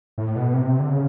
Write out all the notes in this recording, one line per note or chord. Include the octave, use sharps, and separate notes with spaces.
A2
B2
C3
D3
C#3